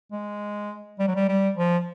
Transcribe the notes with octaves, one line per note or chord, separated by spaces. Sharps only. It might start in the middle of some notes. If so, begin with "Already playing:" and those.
G#3
G3
F#3
G3
G3
F3